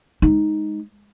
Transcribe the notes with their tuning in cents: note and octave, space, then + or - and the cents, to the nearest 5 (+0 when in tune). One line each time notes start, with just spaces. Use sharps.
G#3 +0 D#4 +0